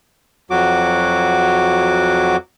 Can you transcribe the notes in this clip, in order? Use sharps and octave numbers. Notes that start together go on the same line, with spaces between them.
F2 F#3 F#4 D6